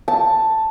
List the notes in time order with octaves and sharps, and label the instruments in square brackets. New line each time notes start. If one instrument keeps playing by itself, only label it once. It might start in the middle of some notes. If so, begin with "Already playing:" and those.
[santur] A5